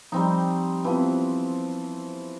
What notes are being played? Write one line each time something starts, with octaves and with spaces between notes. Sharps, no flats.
F3 G3 C4 D#4 A#5
E3 F3 B3 C4